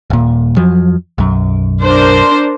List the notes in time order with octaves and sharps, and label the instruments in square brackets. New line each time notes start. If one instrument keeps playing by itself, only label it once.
[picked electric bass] D#1 A#2
F2 F3 F#3
B1 F#2
[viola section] D4 A#4 C5